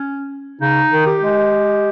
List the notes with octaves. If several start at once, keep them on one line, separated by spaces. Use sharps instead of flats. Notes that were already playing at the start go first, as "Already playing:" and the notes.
Already playing: C#4
C#3 D#4
D#3
G4
G#3